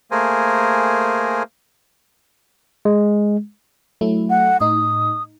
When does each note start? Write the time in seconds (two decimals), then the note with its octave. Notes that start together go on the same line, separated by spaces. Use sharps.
0.11 A3 A#3 G#4 A#4 C5 G#5
2.85 G#3
4.01 F#3 A3 E4
4.30 F#5
4.61 A2 D#4 D#6